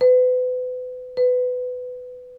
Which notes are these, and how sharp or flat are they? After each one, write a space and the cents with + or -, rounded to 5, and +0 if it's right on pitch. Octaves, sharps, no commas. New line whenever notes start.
B4 +35
B4 +20